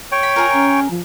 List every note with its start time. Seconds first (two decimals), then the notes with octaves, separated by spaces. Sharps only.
0.12 C#5 G5
0.23 B5
0.36 F4 G#4 A#4
0.53 C#4
0.91 F3